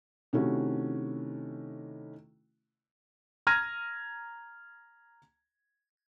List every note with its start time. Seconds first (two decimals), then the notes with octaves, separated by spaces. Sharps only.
0.33 C3 D#3 A3 C#4 E4 F#4
3.47 A#5 F6 G#6 A#6 D#7